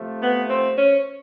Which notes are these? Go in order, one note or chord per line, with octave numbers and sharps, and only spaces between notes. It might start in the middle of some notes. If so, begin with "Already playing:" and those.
Already playing: C3 F3 A3
B3
C4
C#4